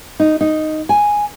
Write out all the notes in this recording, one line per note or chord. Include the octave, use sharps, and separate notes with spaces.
D#4
D#4
G#5